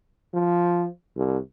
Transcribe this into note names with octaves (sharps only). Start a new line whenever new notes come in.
F3
C2